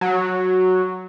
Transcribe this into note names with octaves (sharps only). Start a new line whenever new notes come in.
F#3